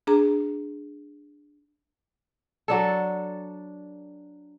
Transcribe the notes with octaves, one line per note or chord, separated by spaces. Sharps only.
D4 G#4 A#5
F#3 D4 A4